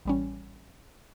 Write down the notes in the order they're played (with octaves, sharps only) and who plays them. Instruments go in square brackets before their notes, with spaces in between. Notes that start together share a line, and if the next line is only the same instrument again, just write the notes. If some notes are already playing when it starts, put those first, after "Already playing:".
[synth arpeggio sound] A1 G3 C#4